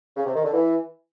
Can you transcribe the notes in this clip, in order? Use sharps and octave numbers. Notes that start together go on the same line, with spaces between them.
C#3
C3
D#3
D3
E3